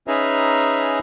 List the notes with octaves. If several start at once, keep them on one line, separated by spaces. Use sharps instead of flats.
C#4 D#4 G#4 B4 E5 A#5